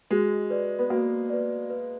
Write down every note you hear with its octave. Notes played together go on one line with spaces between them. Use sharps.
G#3 F#4
B4 D5
B3
A#3 F#4
B4 D5
B4